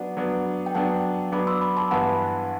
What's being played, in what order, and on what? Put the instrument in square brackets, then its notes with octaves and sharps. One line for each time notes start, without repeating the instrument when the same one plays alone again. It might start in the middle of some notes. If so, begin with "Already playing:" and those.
Already playing: [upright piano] F#3 B3 D4 [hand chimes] D5 F#5
[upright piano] F#3 B3 D4
[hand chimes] G5
[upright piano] F#3 B3 D4 [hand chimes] F#5 A5
[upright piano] F#3 B3 D4 [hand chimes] B5 D6
[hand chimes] C6 E6
B5 D6
A5 C6
[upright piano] G2 E3 B3 E4 B4 [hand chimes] F#5 A5